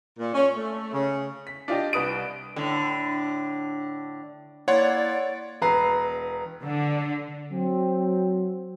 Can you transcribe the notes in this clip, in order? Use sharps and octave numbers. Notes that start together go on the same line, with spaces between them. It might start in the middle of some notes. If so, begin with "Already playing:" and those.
A#2
C#4
A3
C#3
B6
D4 F4 G4 D#5
C2 B4 D#6 D7
A2 D3
A#3 E4 C#5 D5 F#5 C6
E1 B4 A#5 C7
D3
F#3 C4